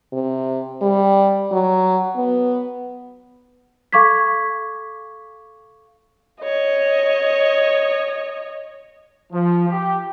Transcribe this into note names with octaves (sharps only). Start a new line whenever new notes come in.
C3
G3
F#3
B3
A4 F5 C#6 D6 G#6 B6
C#5 D#5
F3
G4